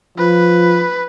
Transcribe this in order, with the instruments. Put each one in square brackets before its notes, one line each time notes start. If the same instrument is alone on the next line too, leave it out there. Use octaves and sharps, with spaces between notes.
[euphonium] F3 [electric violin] B4